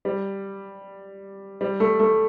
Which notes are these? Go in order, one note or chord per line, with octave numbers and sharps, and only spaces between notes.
G3
G3
A3
A3